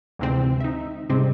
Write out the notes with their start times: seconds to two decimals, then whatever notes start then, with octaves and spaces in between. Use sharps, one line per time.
0.19 D2 G#2 C3 E3 C4
0.60 D#4 E5
1.09 G#2 C3 G3 C4